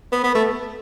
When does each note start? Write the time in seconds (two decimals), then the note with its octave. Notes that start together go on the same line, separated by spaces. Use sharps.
0.12 B3
0.24 B3
0.35 A3